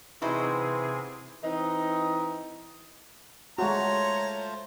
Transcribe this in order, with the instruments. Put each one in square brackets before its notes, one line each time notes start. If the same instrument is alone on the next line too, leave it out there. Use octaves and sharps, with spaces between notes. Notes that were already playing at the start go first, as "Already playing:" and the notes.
[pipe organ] C3 C4 G#4 [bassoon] E3 [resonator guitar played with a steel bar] D#4 E4 F#4
[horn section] E3 C4 D#4
[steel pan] G#3 F#4 [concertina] A3 F4 C5 [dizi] C#5 [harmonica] A#5